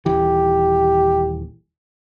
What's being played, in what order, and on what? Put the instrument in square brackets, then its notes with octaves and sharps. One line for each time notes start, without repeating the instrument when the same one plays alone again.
[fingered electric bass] D#1 E3 [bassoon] G4